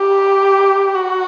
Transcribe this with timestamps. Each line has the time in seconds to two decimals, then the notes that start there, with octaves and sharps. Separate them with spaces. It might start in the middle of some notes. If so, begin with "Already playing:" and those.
Already playing: G4
0.95 F#4